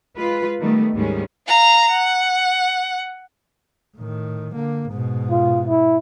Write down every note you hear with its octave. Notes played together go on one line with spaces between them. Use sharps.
G#3 F4 B4
D#3 G3 A3 B3
D2 G#2 D#3 G3 G#3 C#4
F5 A#5
F#5
A2 D#3
D3 A#3
G#2 B2
F4
E4